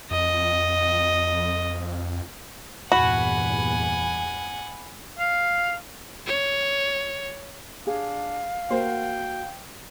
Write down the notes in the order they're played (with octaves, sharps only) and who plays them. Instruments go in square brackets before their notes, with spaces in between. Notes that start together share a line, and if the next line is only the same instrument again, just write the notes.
[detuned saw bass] F2 [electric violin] D#5
[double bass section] E2 G2 A#2 [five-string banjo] F#4 [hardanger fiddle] F#5 G#5 [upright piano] B5
[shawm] F5
[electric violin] C#5
[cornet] D4 [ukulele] G#4 [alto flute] F5
[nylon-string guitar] A#3 F#4 A#4 [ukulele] C5 [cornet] G5